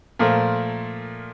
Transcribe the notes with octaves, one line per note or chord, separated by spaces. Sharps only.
A#2 F3 A3 A#4